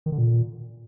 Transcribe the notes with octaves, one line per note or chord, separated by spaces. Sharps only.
D#3
D3
A#2